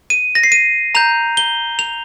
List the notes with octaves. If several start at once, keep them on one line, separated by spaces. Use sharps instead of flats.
D#7
A#6
C7
D#7
A#5 G6 F7
G7
F7